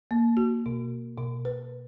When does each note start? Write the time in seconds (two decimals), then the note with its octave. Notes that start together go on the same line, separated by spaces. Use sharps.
0.11 A#3
0.37 F#4
0.66 B2
1.18 B2
1.45 B4